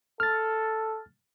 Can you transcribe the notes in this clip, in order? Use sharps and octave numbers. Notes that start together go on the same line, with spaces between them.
A4 F6 A6